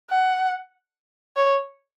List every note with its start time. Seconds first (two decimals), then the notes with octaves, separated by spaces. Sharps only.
0.10 F#5
1.36 C#5